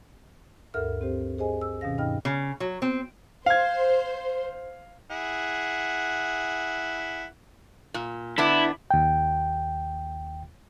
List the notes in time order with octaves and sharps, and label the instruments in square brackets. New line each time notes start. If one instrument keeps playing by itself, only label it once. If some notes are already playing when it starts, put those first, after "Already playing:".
[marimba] D2 G2 A4 A#4 E5 F6
C4 G4 C5
G#4 C5 D#5 G#5
E6
B2 D#3 C#4 F5 A#6
G2 D#4 D#5 G5 F6
[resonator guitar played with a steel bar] C#3
F#3
C4
[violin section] C5 [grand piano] F5 G#6
[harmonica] E4 G#4 F#5
[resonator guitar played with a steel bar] A#2
[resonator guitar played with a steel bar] D3 B3 D4 [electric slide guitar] E4
[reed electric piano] D#2 G5